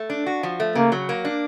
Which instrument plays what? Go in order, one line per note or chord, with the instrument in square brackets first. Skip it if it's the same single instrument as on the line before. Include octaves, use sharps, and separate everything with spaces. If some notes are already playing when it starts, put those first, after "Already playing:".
Already playing: [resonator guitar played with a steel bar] A3
D4
F#4
F3
A3
[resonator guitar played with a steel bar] C#3 [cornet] A#3
[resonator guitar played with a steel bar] F#3
A#3
D4